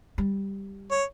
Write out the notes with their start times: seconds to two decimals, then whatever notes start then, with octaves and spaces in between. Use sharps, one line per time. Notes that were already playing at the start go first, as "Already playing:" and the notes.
0.18 G3
0.91 C#5